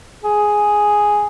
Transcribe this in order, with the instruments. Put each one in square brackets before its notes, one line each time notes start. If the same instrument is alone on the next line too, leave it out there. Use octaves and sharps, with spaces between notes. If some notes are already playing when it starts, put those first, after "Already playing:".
[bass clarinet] G#4